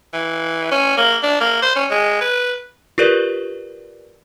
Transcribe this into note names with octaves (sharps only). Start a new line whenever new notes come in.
E3
C#4
A#3
D4
A#3
C5
C#4
G#3
B4
F4 G4 A#4 B4 D5